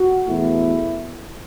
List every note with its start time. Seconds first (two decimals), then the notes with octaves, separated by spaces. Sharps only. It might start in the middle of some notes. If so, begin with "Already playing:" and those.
Already playing: F#4
0.27 E2 B2 A3 E4